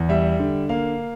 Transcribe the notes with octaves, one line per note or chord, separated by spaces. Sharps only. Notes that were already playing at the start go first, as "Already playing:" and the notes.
Already playing: E2
G3 E5
D3
A#3 F5